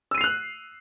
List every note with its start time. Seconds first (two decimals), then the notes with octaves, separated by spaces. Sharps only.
0.11 E6
0.15 D#7
0.18 C7
0.21 F7
0.24 F#6